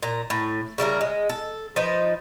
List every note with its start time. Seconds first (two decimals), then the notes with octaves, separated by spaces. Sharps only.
0.03 A#2 A#5
0.30 A2
0.78 C#3 G3 E4 A#4
1.01 G#3
1.29 A4
1.76 F3 D#4 B4 C5